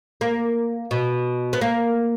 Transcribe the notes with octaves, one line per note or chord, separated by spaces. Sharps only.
A#3
B2
B3
A#3